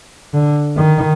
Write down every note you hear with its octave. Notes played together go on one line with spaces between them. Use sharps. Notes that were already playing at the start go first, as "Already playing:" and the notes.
D3
D#3